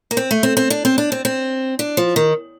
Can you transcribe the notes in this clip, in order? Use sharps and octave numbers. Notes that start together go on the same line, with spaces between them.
A#3
C4
A3
C4
C4
D4
C4
D4
C4
C4
D4
F3
D#3